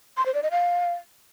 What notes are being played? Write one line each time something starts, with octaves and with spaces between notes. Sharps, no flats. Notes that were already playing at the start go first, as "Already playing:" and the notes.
C6
C5
D5
D#5
F5